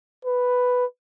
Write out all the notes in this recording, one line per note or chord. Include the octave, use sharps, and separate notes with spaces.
B4